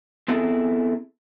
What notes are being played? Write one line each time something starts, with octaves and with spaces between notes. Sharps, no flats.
B3 C4 E4 G#4 A4 E5